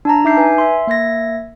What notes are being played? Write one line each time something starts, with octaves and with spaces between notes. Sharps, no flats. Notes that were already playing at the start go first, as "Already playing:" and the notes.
D4 A5 A#5
D#4 E5 D6 G6 C7
B4 G#5
E5 C6
A#3 E5 G#6 A#6